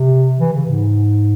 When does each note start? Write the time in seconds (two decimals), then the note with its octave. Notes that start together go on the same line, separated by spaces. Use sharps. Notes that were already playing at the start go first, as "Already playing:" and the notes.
Already playing: C3
0.39 E3
0.53 C#3
0.68 G#2